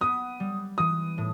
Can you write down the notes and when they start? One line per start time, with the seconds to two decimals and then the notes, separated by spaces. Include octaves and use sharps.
0.01 B3 D#6
0.40 G3
0.78 E3 D#6
1.18 A2